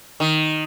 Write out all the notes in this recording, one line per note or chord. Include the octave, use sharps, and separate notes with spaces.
D#3